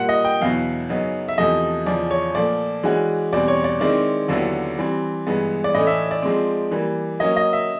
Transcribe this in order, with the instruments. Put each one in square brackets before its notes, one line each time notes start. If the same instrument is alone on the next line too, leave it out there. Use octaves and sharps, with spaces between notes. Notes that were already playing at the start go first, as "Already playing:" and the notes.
Already playing: [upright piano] A#2 G3 A#3 [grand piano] F#5
[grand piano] D#5
G5
[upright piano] E2 B2 F#3 B3 E4 [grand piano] F5
[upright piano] F#2 C#3 F#3 B3 D#4
[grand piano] E5
[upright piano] E2 C3 F3 A3 [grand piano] D#5
[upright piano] E2 C#3 F3 [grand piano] D5
[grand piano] C#5
[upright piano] A#2 F3 A3 [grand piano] D5
[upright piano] E3 G#3 C#4 F#4
[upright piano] E2 B2 G3 C4 [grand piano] D5
[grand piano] C#5
D5
[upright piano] D#3 G#3 C4 E4 [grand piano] D5
[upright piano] D#2 D3 F#3 B3 E4
E3 G3 C4
G2 E3 G#3 B3
[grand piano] D5
[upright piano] A2 E3 A3 C#4 [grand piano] D#5
[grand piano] E5
D5
[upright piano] F3 G#3 C4
E3 G3 A#3
[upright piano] F#3 A#3 C#4 [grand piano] D#5
[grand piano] D#5
E5